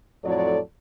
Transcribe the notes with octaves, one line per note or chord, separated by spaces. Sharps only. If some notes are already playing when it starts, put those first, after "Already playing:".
F2 A2 F#3 A4 C#5 D5